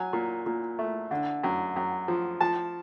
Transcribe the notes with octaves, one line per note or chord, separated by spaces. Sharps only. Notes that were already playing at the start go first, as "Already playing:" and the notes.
Already playing: F#3 G#5
A#2
A#2
A3
D3
F#2
F#2
F3
F3 A5